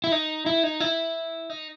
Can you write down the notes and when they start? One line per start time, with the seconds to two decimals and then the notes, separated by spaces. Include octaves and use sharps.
0.04 E4
0.12 D#4
0.46 E4
0.63 D#4
0.80 E4
1.50 D#4